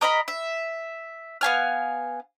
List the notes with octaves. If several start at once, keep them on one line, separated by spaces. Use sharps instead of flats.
A#4 D#5 A#5 B5
E5
B3 F5 G#5 F6